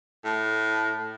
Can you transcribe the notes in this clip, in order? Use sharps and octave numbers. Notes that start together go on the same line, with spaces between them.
A2